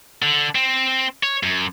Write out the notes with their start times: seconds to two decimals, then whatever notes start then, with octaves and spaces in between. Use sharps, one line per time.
0.22 D3
0.55 C4
1.23 C#5
1.43 F#2